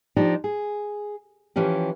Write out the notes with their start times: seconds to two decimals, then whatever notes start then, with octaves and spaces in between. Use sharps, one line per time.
0.16 F3 D4 D#4 G4
0.44 G#4
1.56 E3 F3 C#4 G4